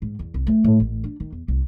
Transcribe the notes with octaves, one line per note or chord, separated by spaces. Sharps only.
G#2
E2
C2
A3
A2
A1
D4
D#3
E2
C2